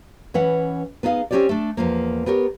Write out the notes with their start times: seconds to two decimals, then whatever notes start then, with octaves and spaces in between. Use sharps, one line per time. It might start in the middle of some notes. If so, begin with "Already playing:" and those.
0.34 E3 C#4 B4 F#5
1.03 B3 D#4 G#4 E5 F5
1.31 C4 C#4 D#4 G4 C#5 D5
1.49 A3 D4
1.77 E2 F3 A#3
2.26 B3 G4 A#4 C#5